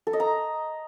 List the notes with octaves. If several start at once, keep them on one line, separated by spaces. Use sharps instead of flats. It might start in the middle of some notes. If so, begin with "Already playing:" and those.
A4
D#5
A#5